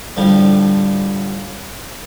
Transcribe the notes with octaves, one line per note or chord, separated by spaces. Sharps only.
A2 D3 F3 G3